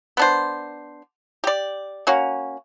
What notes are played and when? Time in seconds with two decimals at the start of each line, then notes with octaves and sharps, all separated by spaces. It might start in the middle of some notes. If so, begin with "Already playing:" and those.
0.17 B3 D4 C5
1.44 G4 D5
2.07 A#3 C#4 F#4